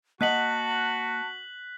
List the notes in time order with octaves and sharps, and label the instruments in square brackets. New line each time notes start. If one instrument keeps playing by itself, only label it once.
[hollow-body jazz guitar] A#3 D#5 F#5 [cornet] F#4 [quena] A5 [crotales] F#6 B6 F#7